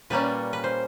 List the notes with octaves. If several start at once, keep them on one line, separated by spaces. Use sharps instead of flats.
A#2 G3 A#3 C#4 B4
B4
C5